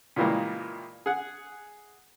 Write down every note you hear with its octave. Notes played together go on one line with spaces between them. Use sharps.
A#2 C#3 E3 G3 G#3 A#3
G#4 F#5